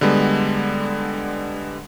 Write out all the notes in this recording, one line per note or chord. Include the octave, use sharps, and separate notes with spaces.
D3 G3 G#3 B3